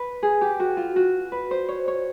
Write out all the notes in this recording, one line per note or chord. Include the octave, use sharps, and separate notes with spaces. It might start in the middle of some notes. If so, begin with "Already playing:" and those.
Already playing: B4
G#4
G4
F#4
F4
F#4
B4
C5
C#5
C#5